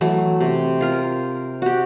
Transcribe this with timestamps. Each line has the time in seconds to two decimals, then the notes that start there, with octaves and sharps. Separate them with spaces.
0.01 E3 F#3 A3
0.41 C3
0.81 F4 A#4
1.62 F#4 G4